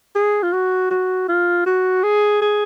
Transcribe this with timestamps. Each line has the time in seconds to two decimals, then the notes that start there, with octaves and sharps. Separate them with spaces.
0.15 G#4
0.43 F4
0.53 F#4
0.91 F#4
1.29 F4
1.66 F#4
2.03 G#4
2.42 G#4